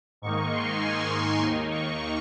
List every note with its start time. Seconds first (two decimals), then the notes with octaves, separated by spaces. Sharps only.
0.22 G#2 D#3 A#3 D#4 C#6
0.52 C6
0.81 G#5
1.11 G#5
1.41 D#2 D#3 A#3 D#4
1.71 C#6